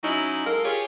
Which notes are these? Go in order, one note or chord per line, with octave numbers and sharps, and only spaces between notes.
F#3 C#4 D#4 E4
G#3 A4 A#4 F5
F4 G4 G#4 C#5